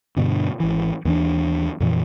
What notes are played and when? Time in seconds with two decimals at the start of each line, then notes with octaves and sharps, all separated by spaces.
0.16 G2 B2 D3
0.60 G#1 E3
1.05 D#2 E3 D4
1.80 F2 A#2 E3